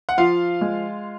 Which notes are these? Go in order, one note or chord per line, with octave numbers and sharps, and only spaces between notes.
F#5
F3 F4 F5
G#3